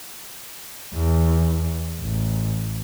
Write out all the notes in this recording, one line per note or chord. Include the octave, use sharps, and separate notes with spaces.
E2
A1